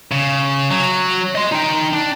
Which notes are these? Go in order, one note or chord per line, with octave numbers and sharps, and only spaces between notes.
C#3
F#3
D#5 C6
D#4 G5
D4